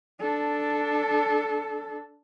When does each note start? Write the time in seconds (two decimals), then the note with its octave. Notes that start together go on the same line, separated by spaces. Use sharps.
0.20 D4 A4